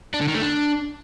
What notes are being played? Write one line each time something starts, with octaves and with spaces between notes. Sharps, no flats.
D4
D3
D#3
A3
D4